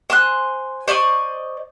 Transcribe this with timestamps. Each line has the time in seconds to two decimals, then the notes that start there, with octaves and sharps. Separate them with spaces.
0.10 C5 G#5 C6 F#6
0.88 C5 D5 D#5 C#6